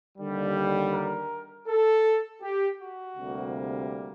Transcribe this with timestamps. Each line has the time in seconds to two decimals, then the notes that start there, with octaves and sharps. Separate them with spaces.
0.18 D#2 D3 G3
0.92 A#4
1.67 A4
2.41 G4
2.79 F#4
3.16 D2 C3 G3 A#3